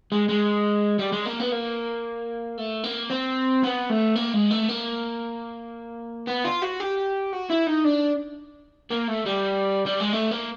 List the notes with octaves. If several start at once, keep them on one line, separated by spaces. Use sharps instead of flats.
G#3
G#3
G3
G#3
A#3
B3
A#3
A3
A#3
C4
B3
A3
A#3
G#3
A3
A#3
B3
F4
F#4
G4
F#4
E4
D#4
D4
A#3
A3
G3
G3
G#3
A3
A#3